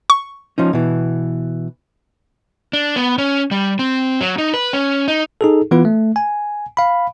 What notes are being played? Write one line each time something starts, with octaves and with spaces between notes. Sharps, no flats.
C#6
F3 C#4 D#4
B2 E3
D4
B3
C#4
G3
C4
F#3
D#4
B4
C#4
D#4
D#4 G#4 A4
E3 B3 F4 B4
A3
G#5
F5 B5